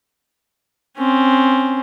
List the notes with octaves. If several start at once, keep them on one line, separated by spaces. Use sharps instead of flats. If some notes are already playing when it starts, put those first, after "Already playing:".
C4 C#4